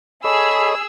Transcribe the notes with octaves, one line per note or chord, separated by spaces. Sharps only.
G#4 A4 C#5 D#5 B5 E6